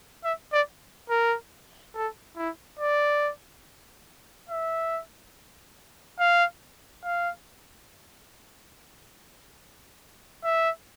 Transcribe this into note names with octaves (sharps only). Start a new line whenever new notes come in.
E5
D5
A#4
A4
E4
D5
E5
F5
F5
E5